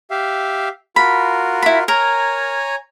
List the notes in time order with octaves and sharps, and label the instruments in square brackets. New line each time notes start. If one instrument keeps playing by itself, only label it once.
[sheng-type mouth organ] G4 E5 F5
[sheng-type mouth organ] F4 F#4 A#4 [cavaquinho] B5
[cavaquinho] E4 B5
[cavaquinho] A#4 [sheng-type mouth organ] C#5 G#5 A#5